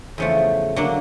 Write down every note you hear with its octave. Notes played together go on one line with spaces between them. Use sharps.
E2 C#3 F3 A3
D3 F#3 A#3 D4